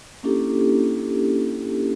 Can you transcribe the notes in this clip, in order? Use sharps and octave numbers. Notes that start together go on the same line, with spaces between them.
A#3 C#4 D4 E4 G4 A4